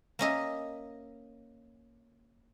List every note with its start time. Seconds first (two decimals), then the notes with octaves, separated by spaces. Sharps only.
0.19 A#3 C#4 D#5 E5